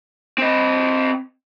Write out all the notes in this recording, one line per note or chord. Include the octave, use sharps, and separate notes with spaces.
C4 D#5